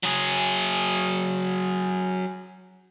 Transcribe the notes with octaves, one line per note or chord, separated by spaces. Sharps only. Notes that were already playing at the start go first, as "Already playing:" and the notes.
F#3 G#4